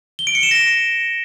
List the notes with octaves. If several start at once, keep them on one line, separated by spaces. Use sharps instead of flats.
G7
D7
C#7
E7
A#6